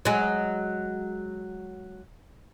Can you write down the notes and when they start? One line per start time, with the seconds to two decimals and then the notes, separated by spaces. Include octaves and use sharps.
0.05 F#3 G#3